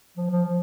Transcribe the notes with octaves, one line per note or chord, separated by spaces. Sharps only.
F3
F3
F3